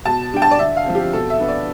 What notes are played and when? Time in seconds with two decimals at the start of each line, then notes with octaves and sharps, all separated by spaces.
0.05 B2 A5
0.32 G3 D4 G5
0.42 A5
0.51 D5
0.59 D3 E5
0.76 F5
0.86 F3 C4
0.95 G4
1.13 B2 A4
1.30 E5
1.40 B3 D4
1.48 D5